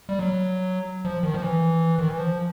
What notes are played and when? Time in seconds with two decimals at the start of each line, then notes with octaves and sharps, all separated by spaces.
0.09 G3
0.19 F#3
1.05 F3
1.23 D#3
1.34 F3
1.42 E3
1.99 D#3
2.09 E3
2.18 F3